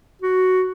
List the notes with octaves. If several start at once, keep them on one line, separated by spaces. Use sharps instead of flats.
F#4